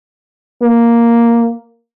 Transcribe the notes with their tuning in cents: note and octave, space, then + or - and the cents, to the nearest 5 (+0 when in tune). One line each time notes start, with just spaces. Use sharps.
A#3 +0